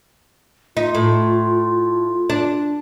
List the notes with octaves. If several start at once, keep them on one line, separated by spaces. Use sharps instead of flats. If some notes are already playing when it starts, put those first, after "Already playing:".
D#4 F4
A2
D4